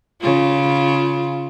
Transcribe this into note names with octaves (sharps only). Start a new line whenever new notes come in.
C#3 F4